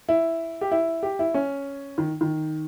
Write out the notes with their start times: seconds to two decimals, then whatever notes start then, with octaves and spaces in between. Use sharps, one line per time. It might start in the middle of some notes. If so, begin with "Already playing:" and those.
0.09 E4
0.61 G4
0.71 E4
1.03 G4
1.19 E4
1.34 C#4
1.98 D#3
2.21 D#3